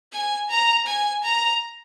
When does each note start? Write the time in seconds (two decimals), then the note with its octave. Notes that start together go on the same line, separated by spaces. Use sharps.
0.12 G#5
0.50 A#5
0.87 G#5
1.24 A#5